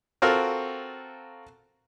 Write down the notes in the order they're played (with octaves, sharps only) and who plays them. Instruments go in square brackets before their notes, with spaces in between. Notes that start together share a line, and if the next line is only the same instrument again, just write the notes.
[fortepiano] C4 F4 F#4 A4 A#4